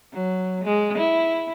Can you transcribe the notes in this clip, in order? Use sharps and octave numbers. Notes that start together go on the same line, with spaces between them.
F#3
G#3
E4